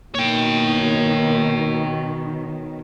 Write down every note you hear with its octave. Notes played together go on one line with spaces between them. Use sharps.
B2 D#3 A#3 C#5 G5